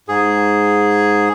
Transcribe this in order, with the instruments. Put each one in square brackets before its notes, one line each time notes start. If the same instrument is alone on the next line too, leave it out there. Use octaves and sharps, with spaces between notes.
[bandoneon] G#2 G#4